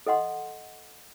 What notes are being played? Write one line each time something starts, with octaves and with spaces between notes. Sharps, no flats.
A4 D#5 F#5 C6